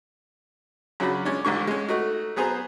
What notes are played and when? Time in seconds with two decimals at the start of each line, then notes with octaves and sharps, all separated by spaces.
1.00 F#2 C#3 F#3 D4 F#4 B5
1.25 G#3 C#4 D4
1.45 A1 G#2 D3 C#6
1.67 G#3 C#4
1.89 A3 D#4 F#4
2.36 F#3 B3 G#4 C5 A#5